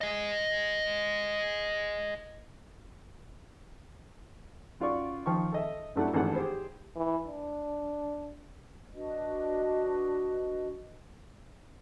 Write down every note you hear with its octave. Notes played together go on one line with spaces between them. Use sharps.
G#4 D#5
F#2 F4 D5 C#6
D#3 F3 G5 C#6
A4 D#5 E5
G2 F#3 A3 D4 E4 F#5
G#1 G2 E3 A3 D4 F#5
G4 G#4 C5
E3
D4
D4 F#4 B4 D#5